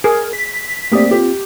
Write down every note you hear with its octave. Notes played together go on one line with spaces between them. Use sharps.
G#4 A#4
B6
A3 A#3 C4 G4 D5 D#6
C4 F4 G4